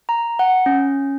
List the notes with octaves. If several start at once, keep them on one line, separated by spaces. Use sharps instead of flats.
A#5
F#5
C#4